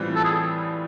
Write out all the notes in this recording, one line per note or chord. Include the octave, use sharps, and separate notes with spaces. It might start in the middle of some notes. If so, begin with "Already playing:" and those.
Already playing: A2 E3 G3 C4 F4
A4
G#4